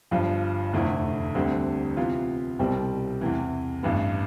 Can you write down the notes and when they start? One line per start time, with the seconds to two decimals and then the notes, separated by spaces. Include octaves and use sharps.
0.11 G1 G2 F3
0.73 F1 E2 D3 A3 E4
1.35 D2 D3 G3 C4
1.97 C3 E3 B3 F4
2.59 C2 B2 G3 C4
3.21 E2 C3 E3
3.83 A1 G2 E3 B3